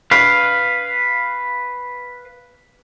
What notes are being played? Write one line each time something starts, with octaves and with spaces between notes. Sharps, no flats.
B4 F5